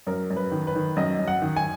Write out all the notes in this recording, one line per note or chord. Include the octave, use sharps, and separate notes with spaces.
F#2 A#4
F#2
B4
D#3
B4
D#3
F#2 D#5
F#2
F#5
D#3
G#5